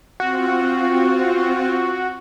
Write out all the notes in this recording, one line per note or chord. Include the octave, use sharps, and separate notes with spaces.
C4 F4 F#4